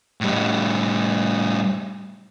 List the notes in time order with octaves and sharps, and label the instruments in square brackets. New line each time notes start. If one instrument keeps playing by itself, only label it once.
[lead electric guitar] A2 G3